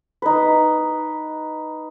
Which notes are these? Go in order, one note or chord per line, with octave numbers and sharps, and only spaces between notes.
D#4 B4